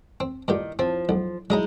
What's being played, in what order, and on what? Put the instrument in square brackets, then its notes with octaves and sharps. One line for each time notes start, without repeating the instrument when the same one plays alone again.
[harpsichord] C4
[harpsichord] G2 A#2 G4 [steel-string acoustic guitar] D#3
[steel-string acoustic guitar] F3 [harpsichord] C4
[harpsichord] B1
[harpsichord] F#3 D#5 A#5 [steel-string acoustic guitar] G#3 D#4 E4